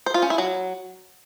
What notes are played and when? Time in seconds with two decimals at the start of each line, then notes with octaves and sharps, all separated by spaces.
0.06 C5
0.14 F4
0.22 C#4
0.30 E4
0.38 F#3